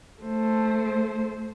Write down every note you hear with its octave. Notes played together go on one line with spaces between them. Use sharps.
A3 C5